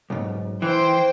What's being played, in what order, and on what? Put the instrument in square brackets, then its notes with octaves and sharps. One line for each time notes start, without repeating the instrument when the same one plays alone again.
[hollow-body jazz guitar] B1 G#2
[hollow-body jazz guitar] E3 [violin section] C5 G5 C6